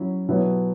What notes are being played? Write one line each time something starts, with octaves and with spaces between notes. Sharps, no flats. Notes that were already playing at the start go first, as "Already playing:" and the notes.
Already playing: F#3 C#4 E4
B2 F#3 B3 E4